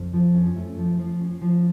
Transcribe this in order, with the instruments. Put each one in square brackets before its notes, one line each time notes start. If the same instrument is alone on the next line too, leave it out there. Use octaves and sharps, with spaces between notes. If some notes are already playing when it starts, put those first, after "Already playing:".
Already playing: [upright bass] F2
[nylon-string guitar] F3
C#4
A3
F3
F3
C#4
F3